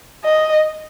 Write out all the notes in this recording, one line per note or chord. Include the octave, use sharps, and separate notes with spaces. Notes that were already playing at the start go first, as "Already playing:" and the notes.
D#5